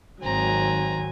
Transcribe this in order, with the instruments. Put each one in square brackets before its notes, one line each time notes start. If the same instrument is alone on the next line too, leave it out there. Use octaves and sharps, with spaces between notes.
[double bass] G#1 D#3 [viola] F#3 G#5 [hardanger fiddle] C4 A#5